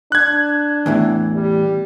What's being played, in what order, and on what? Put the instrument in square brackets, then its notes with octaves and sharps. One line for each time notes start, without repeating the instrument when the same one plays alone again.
[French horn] D4 [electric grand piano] F#6 G#6
[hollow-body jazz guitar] E2 A2 E3
[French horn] G3